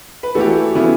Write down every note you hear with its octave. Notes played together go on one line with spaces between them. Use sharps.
B4
E3 A3 E4 F#4 G4 A4
C#3 E3 B3 E4